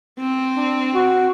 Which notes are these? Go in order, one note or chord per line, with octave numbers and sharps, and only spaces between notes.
C4
D4
F#4